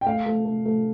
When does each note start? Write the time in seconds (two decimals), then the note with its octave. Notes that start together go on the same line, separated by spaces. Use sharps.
0.01 G5
0.06 A3 F5
0.26 A3
0.45 A3
0.66 A3